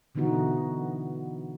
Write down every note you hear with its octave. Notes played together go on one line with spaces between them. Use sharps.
B2 D3 E3 B3 D#4 F#4